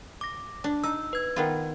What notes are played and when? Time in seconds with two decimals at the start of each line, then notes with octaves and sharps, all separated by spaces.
0.21 D6 A#6
0.64 D4
0.84 D#4 E6
1.13 B4 G#6
1.36 D#3 B3 F4